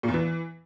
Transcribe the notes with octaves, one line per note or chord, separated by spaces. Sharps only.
A#2
E2
E3